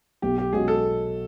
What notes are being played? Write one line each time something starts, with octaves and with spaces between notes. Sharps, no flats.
B1 G4
G4
B2 G#3 C#4 F#4 G#4
A4